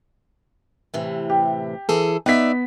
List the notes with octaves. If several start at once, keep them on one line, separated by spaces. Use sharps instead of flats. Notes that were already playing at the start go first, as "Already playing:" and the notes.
A2 C3 E3
G4
E3 G#4 A4
B3 D#4 D5 E5 B6